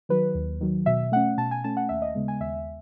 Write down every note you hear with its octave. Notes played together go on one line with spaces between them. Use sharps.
D#3 F#3 B4
D#2
D#3 F#3
B2 E5
A3 C#4 F#5
B2 A5
G#5
A3 C#4 A5
F#5
D#2 E5
D#5
C#3 G#3 B3
G#5
D#2 E5